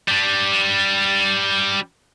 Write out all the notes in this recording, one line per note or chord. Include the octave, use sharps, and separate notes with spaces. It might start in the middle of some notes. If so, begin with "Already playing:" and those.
G3 D4